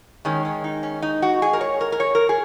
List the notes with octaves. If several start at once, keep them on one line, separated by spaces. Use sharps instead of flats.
D#3 G#3 C#4
C#4
D#4
C#4
D#4
F#4
G#4
A#4
C#5
A#4
A#4
C#5
A#4
G#4